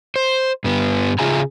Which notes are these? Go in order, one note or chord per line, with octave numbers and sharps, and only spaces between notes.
C5
G2 B3
C#3 F4 G#4 E5 G#5 A#5